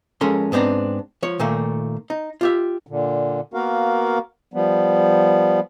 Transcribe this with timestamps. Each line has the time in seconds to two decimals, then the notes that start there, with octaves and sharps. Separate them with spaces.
0.21 F3 G#3 C#4 A4 A#4 C6
0.52 G#2 B3 C4 D4 A#5
1.23 F3 C#5
1.39 A#2 D#3 A3 A#3
2.10 D#4
2.41 F4 G4 E5
2.87 A#2 D3
3.54 A#3 B3 F#4 A#4 F5
4.54 F3 G3 B3